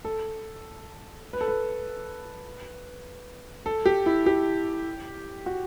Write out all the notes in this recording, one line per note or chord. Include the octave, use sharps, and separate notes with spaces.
A4
B4
A4
B4
A4
G4
E4
G4
F#4